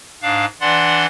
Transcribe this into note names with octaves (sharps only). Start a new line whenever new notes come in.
G#2 D4 F5
E3 D4 D5 F#5 C6